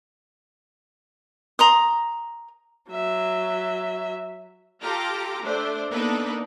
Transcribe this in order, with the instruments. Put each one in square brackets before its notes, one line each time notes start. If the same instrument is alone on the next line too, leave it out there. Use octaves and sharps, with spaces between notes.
[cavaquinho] A#5 C6 D#6
[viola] F#3 E5
[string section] F4 G4 A4 G5 A#5 D6
A3 D4 C5
A#3 B3 D4 D#4 A4 B4